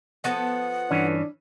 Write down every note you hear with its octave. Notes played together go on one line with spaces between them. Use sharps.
F3 B3 A4 F#5
G2 E3 C#4 D4